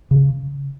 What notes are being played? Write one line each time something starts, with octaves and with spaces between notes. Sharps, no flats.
C#3